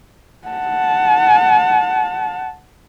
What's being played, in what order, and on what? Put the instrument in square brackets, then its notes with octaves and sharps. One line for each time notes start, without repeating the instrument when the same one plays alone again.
[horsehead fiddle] F#5 A5